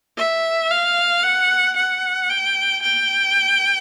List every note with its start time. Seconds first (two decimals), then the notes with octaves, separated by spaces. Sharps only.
0.18 E5
0.71 F5
1.23 F#5
1.76 F#5
2.30 G5
2.83 G5